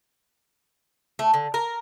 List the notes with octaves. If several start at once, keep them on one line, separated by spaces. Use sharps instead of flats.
A3
D3
A#4